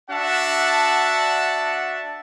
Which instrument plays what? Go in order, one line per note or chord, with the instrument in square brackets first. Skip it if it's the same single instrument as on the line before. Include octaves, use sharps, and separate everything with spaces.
[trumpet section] D4 F#4 E5 F#5 A5